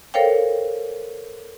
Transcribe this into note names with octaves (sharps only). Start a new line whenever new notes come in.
A4 A#4 C5 C#5 F5 G5